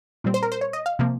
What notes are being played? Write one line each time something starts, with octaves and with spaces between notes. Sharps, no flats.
A#2 G3 C4
C5
A#4
C5
C#5
D#5
F5
C3 F3 A#3